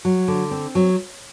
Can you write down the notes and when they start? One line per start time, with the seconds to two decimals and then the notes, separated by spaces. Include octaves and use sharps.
0.05 F#3
0.28 D3
0.51 C4
0.75 F#3